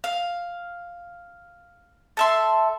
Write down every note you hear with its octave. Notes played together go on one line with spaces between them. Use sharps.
F5
A4 E5 C6